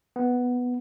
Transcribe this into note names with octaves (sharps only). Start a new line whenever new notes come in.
B3